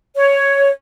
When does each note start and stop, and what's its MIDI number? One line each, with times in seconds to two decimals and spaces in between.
0.15 0.70 73